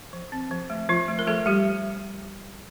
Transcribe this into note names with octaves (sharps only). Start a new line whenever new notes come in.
F3
C4
F3
A3
F3 F4
A3
A#4
F3 A3 A4
G3 A3 G4